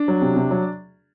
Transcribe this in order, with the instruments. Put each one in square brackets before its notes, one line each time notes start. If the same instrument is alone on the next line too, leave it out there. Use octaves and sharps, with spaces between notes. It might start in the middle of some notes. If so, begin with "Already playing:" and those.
Already playing: [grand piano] D4
F#3
C3
C3
F#3